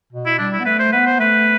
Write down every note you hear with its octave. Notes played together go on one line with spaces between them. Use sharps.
B2
E4
G3 D4
E4
B3
A3 B4
C5
B3 B4
C5
A3 B4